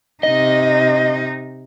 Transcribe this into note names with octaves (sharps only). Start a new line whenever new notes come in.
C3 D#4 D#5